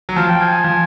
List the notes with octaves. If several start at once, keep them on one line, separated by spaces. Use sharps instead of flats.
F#3
F3 F5
G5
G#5
G#5
F3